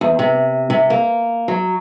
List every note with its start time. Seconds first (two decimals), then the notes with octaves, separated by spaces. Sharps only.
0.01 E2
0.19 C3
0.70 C3
0.90 A#3
1.48 F#3